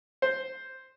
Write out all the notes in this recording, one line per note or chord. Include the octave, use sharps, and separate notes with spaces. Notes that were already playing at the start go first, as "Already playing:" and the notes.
C5